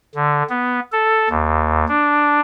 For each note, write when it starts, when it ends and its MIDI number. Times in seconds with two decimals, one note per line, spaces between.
0.15 0.43 50
0.49 0.80 59
0.92 1.28 69
1.30 1.85 39
1.88 2.40 62